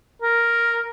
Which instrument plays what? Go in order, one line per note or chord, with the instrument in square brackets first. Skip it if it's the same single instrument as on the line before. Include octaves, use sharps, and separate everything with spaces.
[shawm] A#4